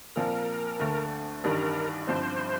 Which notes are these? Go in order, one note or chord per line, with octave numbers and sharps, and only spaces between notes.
A#2 F3 C4 F4 A#4
D2 D3 A3
A1 G2 D#3 G3 A#4
G1 G2 F3 C4 C5